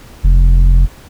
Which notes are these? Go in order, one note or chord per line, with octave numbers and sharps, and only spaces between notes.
F1